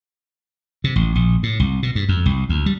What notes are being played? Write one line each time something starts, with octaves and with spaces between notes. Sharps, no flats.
C3
A1
A#1
A2
C2
B2
G2
F2
C2
D2
G3